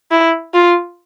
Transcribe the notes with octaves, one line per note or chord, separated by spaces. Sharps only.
E4
F4